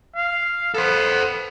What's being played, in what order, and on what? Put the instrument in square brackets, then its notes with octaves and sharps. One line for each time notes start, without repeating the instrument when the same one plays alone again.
[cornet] F5
[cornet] B3 [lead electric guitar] A4 C5